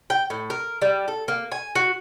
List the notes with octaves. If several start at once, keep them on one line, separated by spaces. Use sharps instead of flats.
G5
A2
A#4
G3
A4
A#3
G#5
F#4